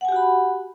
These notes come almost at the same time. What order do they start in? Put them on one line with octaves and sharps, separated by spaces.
F#5 G#5 G4 F#4 B5